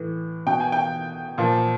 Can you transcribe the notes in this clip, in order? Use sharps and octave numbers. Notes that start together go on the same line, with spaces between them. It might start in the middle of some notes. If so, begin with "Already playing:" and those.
Already playing: A2 E3
B2 G5
G#5
G5
A#2 F3